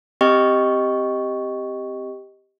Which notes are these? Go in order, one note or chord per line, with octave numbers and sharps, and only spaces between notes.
C4 G4 D#5 G5 C#6